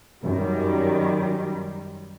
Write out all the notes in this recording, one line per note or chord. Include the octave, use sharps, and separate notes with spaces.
F#2 D#3 G3